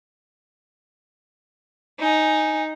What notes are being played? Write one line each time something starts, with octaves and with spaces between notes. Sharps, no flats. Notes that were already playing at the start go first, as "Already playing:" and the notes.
D#4 G#5